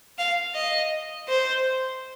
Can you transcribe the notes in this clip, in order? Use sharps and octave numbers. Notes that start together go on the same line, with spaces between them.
F5
D#5
C5